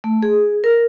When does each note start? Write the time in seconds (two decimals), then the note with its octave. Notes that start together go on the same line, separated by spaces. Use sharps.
0.04 A3
0.23 G#4
0.64 A#4